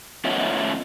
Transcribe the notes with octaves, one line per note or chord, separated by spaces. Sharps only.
A3 B3 C#4 F4 C#5 D#5